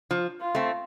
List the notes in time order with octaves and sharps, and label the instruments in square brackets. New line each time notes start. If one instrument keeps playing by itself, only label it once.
[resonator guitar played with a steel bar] F3
[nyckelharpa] F4
[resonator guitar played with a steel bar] A3 C4